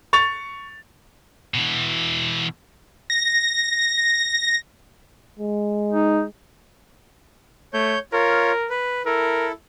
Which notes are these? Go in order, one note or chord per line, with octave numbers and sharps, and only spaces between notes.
C#6 A6 F7
B2 E3
A#6
G#3
D#4
A3 C#5 G6
F4 A#4 C#5
B4
E4 A4 A#4